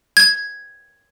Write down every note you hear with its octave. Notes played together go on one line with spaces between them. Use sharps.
G#6